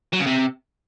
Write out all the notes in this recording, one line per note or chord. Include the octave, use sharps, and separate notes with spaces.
F#3
C#3
C3